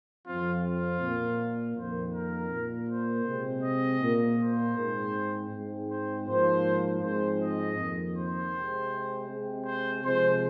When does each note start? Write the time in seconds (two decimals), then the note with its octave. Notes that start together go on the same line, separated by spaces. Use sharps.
0.25 F2 F3 C4 F4
0.62 F4
1.00 A#2 A#3
1.76 F2 D#3 A#3 C5
2.13 A#4
2.50 A#2 A#3
2.89 C5
3.26 C3 G#3 C4
3.63 D#5
4.00 A#2 A#3
4.38 C5
4.76 G#2 G#3 C4
5.51 G#2 G#3 C4
5.89 C5
6.27 G#2 F3 A#3 C5
7.01 G#2 F3 G#3 C4 C5
7.40 D#5
7.76 F2 D#3 A#3
8.15 C5
8.52 C3 G#3 C4
9.28 C3 G#3 C4
9.65 C5
10.02 C3 F3 G#3 C4 C5